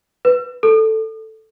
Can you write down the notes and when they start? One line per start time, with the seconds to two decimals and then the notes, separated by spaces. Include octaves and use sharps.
0.25 B4
0.63 A4